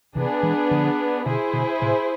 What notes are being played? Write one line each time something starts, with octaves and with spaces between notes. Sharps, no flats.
C3 E3 B3 D4 G#4
E3 G#3
D3 F3
B2 D3 E4 G#4 C5
B2 D3
A2 C3